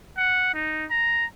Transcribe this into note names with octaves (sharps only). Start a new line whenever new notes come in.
F#5
D#4
A#5